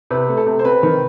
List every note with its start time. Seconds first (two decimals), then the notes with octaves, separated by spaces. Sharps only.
0.10 C3 B4
0.28 A3
0.37 A4
0.47 C3
0.59 C5
0.65 C4 B4
0.83 D#3